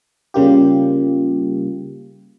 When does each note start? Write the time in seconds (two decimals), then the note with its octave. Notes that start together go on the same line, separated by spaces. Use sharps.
0.34 C#3 G3 A#3 F4 G4